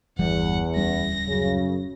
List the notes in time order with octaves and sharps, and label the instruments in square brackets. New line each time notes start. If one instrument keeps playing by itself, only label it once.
[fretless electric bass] G1 E3 G3 [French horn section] E2 [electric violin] F#5
[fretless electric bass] D1 G3 C#4 [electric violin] A#6
[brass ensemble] F#2 [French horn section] C#3